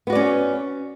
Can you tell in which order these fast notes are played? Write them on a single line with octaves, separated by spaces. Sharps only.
B3 F#4 D5 C#4